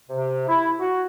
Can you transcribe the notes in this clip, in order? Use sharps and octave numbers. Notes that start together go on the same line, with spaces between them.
C3
E4
F#4